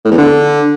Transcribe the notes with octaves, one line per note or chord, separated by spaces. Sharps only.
A2
E2
D3